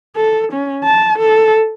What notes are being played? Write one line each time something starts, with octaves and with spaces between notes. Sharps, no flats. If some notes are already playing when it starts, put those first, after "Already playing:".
A4
C#4
A5
A4